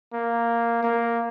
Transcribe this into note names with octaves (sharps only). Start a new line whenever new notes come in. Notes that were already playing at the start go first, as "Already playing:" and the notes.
A#3
A#3